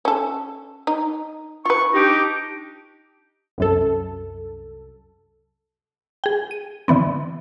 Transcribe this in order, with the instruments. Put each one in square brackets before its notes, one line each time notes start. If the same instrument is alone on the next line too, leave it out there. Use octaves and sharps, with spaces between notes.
[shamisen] C#4 A4
D#4
[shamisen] F4 B4 [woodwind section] C#6
[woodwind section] D4 D#4 G4
[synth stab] C2 F#2 A4
[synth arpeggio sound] G#4 G5
D#7
D3 E3 B3 C4